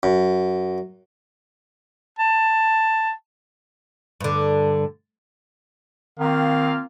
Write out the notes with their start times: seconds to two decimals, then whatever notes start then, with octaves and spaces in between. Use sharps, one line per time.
0.03 F#2
2.19 A5
4.20 G2 D3
6.19 D#3 A#3 C4 F4 F5